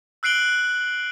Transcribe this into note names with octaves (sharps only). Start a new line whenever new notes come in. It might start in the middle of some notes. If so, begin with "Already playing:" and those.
E6 F#6 C7 D7 F#7 G7